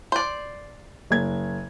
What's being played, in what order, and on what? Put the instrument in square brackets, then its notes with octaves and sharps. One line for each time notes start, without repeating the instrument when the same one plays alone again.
[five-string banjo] C5 D5
[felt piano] F#1 G#6